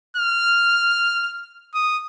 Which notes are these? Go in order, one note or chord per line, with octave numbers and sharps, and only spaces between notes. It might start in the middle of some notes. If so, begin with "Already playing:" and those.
F6
D#6